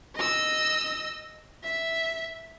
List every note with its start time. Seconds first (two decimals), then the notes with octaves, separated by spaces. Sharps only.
0.15 D#5 E6
1.63 E5